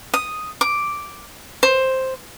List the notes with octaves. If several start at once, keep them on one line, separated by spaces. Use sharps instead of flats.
D#6
D6
C5